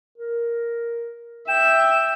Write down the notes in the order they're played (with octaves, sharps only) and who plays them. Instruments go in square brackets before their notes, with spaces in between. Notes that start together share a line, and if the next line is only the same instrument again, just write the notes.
[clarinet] A#4
[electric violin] E5 [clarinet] G5 [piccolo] E7